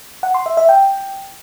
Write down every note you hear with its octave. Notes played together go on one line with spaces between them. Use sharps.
F#5
C6
E5
E5
G5